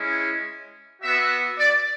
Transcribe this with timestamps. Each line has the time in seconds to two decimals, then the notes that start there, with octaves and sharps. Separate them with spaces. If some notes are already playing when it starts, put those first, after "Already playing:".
Already playing: G#3 C#4 E4
1.02 B3 F#4 E5
1.59 D5